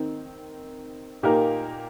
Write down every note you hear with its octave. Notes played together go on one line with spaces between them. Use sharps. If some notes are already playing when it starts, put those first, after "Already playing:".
Already playing: D#3 C4 D#4
A#2 A#3 D#4 G4 A#4